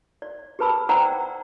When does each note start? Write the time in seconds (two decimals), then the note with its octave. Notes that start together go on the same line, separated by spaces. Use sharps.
0.22 D5
0.59 G4 G#4 B4 A5 B5 E6
0.89 C5 D5 F#5 G5 A#5 E6